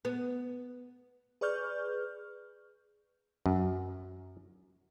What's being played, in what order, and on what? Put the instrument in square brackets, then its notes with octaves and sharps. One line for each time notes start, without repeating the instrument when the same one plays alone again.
[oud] B3
[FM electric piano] G#4 B4 D5 C#6 F6 G6
[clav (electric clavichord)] F#2